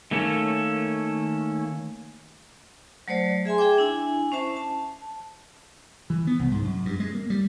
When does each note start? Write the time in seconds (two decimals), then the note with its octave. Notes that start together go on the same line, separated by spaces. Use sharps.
0.11 D#3 A3 A#3 C#4 A4
3.08 F#3 A3 C5 D5
3.45 G#4 E5 G#5 C6
3.58 G#4 E5 G5 D6
3.78 D4 E4 G#5
4.32 C#4 C5 E5 A5
4.57 A5
6.10 E3
6.27 B3
6.39 C2
6.52 G#2
6.65 F#2
6.85 G2
7.00 G#3
7.15 A#3
7.30 G3